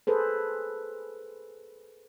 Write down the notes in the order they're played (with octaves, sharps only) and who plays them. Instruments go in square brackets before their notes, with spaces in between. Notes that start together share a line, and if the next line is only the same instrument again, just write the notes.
[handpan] G#4 A4 B4 C5